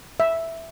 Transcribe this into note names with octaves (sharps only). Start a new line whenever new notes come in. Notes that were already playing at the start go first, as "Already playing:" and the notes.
E5